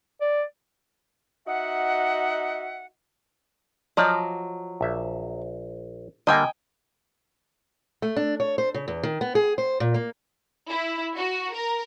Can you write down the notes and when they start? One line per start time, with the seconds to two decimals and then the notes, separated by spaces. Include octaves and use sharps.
0.21 D5
1.46 D#4 F#4 D#5 E5 F#5
3.97 F3 F#3 D5 D#5
4.81 A#1 E5
6.27 D3 G3 A#3 D#5 G5 G#5
8.02 A3
8.16 D4
8.40 C#5
8.58 C5
8.74 C#3
8.88 E2
9.03 D#3
9.21 B3
9.35 G#4
9.58 C5
9.80 A#2
9.94 A#3
10.69 E4
11.16 F#4
11.53 A#4